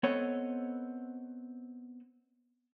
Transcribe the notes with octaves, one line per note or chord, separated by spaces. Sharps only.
B3 C4 A4 C#5 D#5